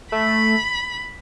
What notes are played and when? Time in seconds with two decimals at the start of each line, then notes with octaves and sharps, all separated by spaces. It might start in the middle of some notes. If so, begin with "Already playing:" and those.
0.12 A3 B5